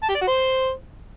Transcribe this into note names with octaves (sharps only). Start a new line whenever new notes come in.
A5
G4
D5
F#4
C5